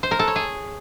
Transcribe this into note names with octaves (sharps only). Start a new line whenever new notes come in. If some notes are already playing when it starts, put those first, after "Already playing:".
C5
A#4
A4
C#5
G#4